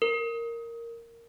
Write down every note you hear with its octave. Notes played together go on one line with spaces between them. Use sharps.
A#4